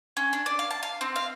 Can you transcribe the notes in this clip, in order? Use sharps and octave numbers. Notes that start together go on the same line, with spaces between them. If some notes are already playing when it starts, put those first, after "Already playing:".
C#4
D4
D5
F5
A5
F5
C4
F5